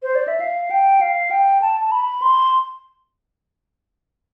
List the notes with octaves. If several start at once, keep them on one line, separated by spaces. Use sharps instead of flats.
C5
D5
E5
F5
G5
F5
G5
A5
A5
B5
C6